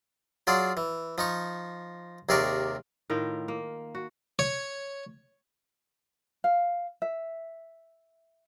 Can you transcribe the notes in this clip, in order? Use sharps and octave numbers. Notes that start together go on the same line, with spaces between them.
F#3 F4 G#4 D5
E3
F3 D#4 C#6
D#2 C3 G#4 A#4 D5 C#6
A2 D#3 F4 A#4
A#3
F#4
C#5
F5
E5